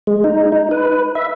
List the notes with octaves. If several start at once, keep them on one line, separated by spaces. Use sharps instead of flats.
G#3
D#4
D#4
B4
E5